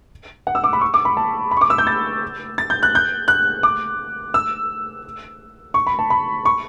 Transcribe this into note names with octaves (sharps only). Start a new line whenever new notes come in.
F#5
E6
D6
B5
C#6
D6
B5
A5
B5
C#6
D6
E6
G6
A6
A6
G6
F#6
G6
F#6
D6
E6
C#6
B5
A5
B5
C#6